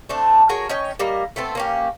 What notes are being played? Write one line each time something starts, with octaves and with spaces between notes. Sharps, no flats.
A3 C4 D4
F#4 G#4 A#4 C#5
C#4 C#5 D#5 G5
G3 A#3 D#5
A3 B3 C4 A4
A#3 C#4 G4